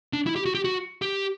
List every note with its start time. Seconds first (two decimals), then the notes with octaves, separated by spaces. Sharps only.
0.13 D4
0.27 E4
0.36 G4
0.46 F#4
0.55 G4
0.64 F#4
1.02 G4